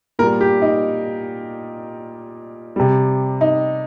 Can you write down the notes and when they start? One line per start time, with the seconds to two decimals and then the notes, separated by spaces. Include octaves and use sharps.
0.19 A#2 A#4
0.22 G3
0.41 G4
0.62 D#4
2.76 C3 G3
3.41 D#4